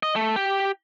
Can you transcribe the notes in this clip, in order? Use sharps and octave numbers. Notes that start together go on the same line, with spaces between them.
D#5
A3
G4